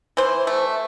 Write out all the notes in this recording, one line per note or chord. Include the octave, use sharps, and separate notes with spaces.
E3 C5
A3